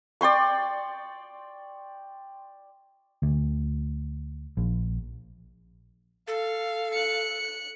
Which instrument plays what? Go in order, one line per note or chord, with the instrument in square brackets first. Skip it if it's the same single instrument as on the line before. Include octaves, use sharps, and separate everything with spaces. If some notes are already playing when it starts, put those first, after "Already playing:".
[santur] D5 G5 C6 C#6
[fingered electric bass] D2
A#1
[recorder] A4 [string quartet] F5
[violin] F#6 C#7